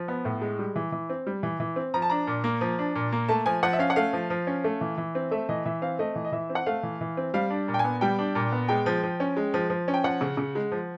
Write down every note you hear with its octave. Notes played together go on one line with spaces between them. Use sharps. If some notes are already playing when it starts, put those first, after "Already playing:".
Already playing: F3
B3
A2
G#3
G3
E3
E3
C4
G3
E3
E3
C4
F3 A#5
A5
D4 A#5
A#2
A#3
F3
D4
A#2
A#3
A3 A5
F3 G#5
F3 F#5
E5
C#4 F5
F#5
A3 F5
F3
F3
C#4
A3
E3
E3
C4
A3 E5
E3 D#5
E3 E5
C4 F5
A3 D#5
E3
D#5
E3 E5
C4
F#5
A3 F5
E3
E3
C4
G3 F5
D4
A#2
G5
G#5
B3
G3 G5
D4
A#2
B3
G#3 G5
F3
F3
C#4
G#3
F3
F3
C#4
G5
F3 F#5
C#3
C#3
G#3
F3